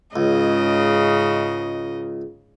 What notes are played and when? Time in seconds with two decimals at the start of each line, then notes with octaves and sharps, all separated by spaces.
0.16 C#2 G#2 C#3 D#5